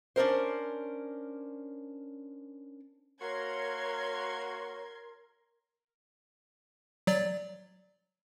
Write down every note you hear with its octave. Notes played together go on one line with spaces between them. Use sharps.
C#4 D4 A4 A#4 C5
A#3 F#4 A#4 C#5 C6 G#6
F#3 D5